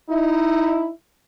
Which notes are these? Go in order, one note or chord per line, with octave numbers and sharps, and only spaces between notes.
D#4 E4